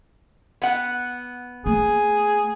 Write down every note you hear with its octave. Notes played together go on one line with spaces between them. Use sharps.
B3 F#5
A3 A#3 G#4